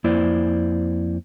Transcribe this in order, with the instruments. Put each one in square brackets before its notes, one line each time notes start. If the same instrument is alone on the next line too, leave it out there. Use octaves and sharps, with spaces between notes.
[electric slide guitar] F2 A#3 E4 C5 D5